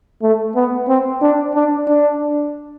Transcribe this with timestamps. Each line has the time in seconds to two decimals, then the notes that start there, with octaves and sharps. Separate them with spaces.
0.22 A3
0.56 B3
0.89 C4
1.21 D4
1.54 D4
1.88 D4